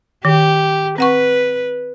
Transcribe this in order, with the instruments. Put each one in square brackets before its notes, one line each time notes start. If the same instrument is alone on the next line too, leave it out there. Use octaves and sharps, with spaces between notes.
[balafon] D#3 [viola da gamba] G4
[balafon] C4 F#5 C#6 [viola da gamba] B4